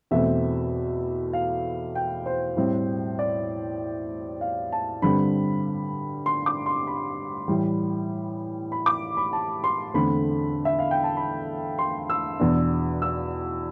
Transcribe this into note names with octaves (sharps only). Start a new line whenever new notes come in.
E2 B2 A3 C4 E5
F5
G5
C5
A2 G3 C4
D5
F5
A5
G2 D3 G3 C4 B5
C6
D6
C6
B5
A2 E3 G3
B5
D6
B5
A5
C6
E2 D3 A3 C4 B5
E5
F5
G5
A5
B5
C6
E6
E2 B2 B3 D4
E6